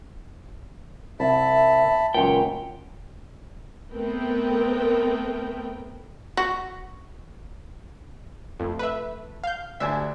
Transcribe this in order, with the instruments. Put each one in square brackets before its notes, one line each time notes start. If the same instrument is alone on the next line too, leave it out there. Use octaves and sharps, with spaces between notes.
[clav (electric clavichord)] C2 [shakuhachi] E5 [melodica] A5 B5
[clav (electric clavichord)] C#2 F#2 A#2 [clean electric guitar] C#5 G5
[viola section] A3 B3 C4 A#4 B4 G5
[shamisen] F#4
[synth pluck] F2 [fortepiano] A3
[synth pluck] B4 E5
F5 G6
[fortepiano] D2 D4 G#5 [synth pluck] E5